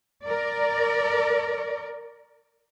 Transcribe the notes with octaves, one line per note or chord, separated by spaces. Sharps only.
A#4 D5